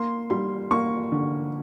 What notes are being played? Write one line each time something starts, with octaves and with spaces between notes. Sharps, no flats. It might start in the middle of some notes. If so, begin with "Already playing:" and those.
Already playing: A#3 C6
G3 C6
A#3 C#6
D3